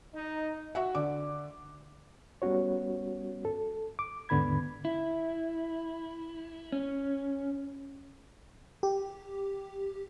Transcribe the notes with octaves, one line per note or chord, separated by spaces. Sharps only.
D#4
F#4 E5 F#5
D3 D5 D6
G3 B3 C#4 F#4 C#5
A4
D6
D#2 G#2 D3 B3 B5 G#6
E4
C#4
G4